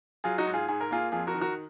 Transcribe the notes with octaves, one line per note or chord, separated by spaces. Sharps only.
F#3 F4 G#4
D#4 F#4
G#2
F4 G#4
G#2 G#4
A#4
A#3 F4 G#4
F2 F4 G#4
F#4 A#4
D#3
F#4 A#4